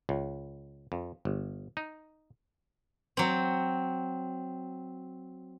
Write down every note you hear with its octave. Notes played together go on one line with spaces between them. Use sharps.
C#2
F2
G1
D#4
F#3 C4